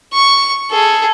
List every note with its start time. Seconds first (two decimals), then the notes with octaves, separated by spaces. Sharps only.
0.13 C#6
0.70 G#4 A4